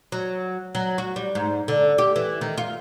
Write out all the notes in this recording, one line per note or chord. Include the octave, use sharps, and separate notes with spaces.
F#3
F#3
F#4
G3
G#2
D3
G4
E3
D#3
F4